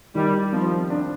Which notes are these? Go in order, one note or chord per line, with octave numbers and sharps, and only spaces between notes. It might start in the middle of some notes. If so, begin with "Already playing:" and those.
D#3 G3
F3 C4
D4